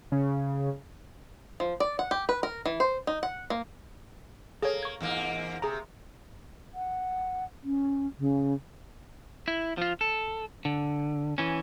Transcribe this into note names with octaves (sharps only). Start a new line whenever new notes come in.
C#3
F3
D5
F#5
G4
B4
A#4
E3
C5
D#4
F#5
A#3
A#3 G#4 A4 C#5
C#6 G#6
E2 G#2 A#3
C3 G#4 A#5
F#5
C#4
C#3
E4
F3 F4
A4
D3
E3 C#4